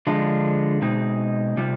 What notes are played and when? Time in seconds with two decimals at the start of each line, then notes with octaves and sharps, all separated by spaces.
0.07 D3 F3 G#3 D4 F4
0.82 B2 G#3 C4 D#4
1.57 C3 G3 C4 F4